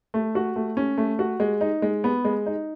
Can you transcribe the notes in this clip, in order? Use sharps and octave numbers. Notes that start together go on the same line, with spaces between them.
A3
F#4
A3
C#4
A3
F#4
G#3
D#4
G#3
B3
G#3
D#4